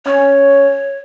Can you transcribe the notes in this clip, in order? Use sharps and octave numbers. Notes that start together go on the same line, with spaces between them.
C#4 C#5